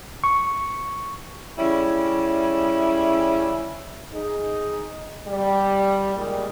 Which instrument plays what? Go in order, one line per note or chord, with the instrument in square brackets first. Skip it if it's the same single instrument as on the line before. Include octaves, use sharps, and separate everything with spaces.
[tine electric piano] C#6
[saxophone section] C#3 G3 C#4 E4
[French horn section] D#4 G#4
G3
A#2 D#3 G3 G#3